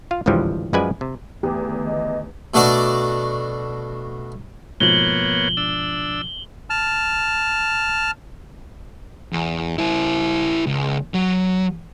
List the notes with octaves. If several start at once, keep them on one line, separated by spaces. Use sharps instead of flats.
F4 F5
G#1 C#2 G2 E3 F3 G3
F#2 F3 G#3 B4 D5 G#5
C3
E2 D3 D#3 A3 G4
D#5
B2 A3 D4 F#4 D5 D6
G#2 B2 F3 A#3 B3 C#5 F#7 G7
D4 E6
A5 F6
E2
E4 C5
C#2
F#3